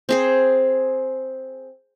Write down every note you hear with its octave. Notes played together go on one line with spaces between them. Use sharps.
C4 G#4 C5